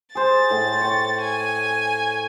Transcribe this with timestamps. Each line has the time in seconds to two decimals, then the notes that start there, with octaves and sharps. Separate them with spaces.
0.15 G#4 C5 A6
0.50 A2
0.81 C#5 G5
1.22 G#5